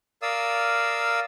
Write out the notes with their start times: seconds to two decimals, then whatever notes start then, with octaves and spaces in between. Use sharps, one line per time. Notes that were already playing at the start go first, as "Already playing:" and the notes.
0.22 A#4 D5 F5 D#6 E6